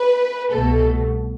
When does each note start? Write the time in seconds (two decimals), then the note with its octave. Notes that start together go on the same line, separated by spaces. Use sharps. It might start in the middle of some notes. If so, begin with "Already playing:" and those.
Already playing: B4
0.51 C2 B2 A3 A4